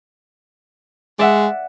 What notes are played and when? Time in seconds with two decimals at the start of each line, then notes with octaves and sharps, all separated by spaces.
1.19 G#3 D5 E5 F#5